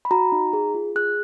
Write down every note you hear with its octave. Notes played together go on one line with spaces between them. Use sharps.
B5
F#4 A#5
D#4
G#4
F4
G#4 F#6